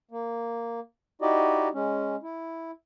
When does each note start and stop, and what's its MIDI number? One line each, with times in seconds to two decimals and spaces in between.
0.11 0.80 58
1.22 1.68 63
1.22 1.68 64
1.22 1.68 66
1.22 1.68 67
1.22 1.68 74
1.22 1.68 75
1.74 2.16 56
1.74 2.16 61
2.23 2.71 64